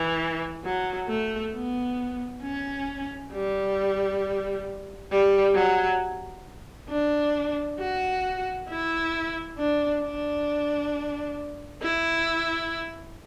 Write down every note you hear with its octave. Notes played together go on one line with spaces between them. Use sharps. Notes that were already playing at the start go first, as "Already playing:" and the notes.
Already playing: E3
F#3
A3
B3
C#4
G3
G3
F#3
D4
F#4
E4
D4
D4
E4